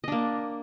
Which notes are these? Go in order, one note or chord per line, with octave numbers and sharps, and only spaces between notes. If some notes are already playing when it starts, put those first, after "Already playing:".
A#3 D4 D#5